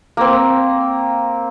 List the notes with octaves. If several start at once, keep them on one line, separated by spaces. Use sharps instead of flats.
A#3 C4